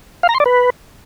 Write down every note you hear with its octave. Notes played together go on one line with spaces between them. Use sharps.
F5
A#5
C6
D5
B4